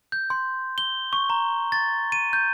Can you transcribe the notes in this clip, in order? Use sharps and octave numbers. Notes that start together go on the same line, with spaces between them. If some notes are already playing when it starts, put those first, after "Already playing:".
G6
C6
G7
C#6
A#5
A6
D#7
G6